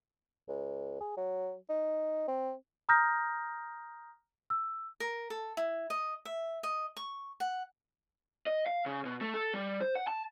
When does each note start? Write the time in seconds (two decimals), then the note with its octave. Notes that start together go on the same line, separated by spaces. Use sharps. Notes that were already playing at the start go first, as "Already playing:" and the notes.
0.48 C#2
1.00 G#4
1.17 F#3
1.69 D#4
2.28 C4
2.89 A#5 D#6 F6 G6 A#6
4.50 E6
5.00 A#4
5.30 A4
5.57 E4
5.90 D#5
6.25 E5
6.63 D#5
6.97 C#6
7.40 F#5
8.47 D#5
8.66 F5
8.86 C#3
9.05 B2
9.21 A3
9.34 A4
9.54 G3
9.81 C5
9.95 F#5
10.07 A5